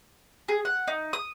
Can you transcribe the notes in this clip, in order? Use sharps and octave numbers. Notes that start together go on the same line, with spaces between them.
G#4
F#5
D#4
D#6